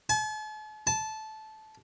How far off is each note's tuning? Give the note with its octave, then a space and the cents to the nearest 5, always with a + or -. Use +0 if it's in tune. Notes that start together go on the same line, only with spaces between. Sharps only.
A5 -45
A5 -15